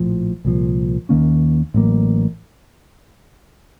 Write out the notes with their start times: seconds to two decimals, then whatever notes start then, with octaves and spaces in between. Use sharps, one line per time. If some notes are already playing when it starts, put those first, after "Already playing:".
Already playing: A#1 A2 F3
0.45 C2 A#2 F3
1.09 D#2 D#3 A#3 C#4
1.74 A1 A2 F#3 A#3